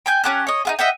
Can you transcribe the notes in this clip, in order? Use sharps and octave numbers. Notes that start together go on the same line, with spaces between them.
G5 G#5 G6
C#4 G4 A5 F#6
C#5 D#5
D#4 F4 G#4
D#5 E5 F#5 G5